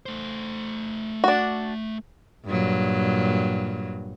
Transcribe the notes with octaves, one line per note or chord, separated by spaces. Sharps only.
A3 C5
D4 F#4
G2 A#2 F#3